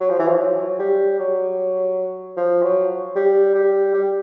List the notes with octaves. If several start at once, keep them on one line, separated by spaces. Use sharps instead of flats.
F#3
F3
E3
F3
F#3
G3
F#3
F3
F#3
G3
G3
G3